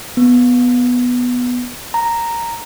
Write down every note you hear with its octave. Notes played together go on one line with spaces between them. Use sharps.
B3
A#5